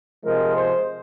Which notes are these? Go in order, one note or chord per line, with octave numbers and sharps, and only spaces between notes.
C3 F3 G#3 A#4
C5